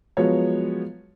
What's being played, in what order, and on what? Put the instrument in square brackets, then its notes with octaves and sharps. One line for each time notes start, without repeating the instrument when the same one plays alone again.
[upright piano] F3 F#3 G#3 B3 C#5